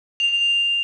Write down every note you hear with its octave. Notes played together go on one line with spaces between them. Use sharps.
F7